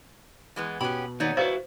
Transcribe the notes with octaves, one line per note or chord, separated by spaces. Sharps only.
E3 G#3 B3
B2 B3 C#4 G4 B5
D#2 B3 D#4 C#5 D5
E4 F#4 B4 C5 F5